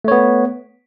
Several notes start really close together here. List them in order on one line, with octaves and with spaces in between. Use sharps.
A3 C#5 B3